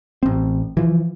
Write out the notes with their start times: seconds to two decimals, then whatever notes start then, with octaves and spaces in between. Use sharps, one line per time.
0.23 A1 C4
0.77 E3 F3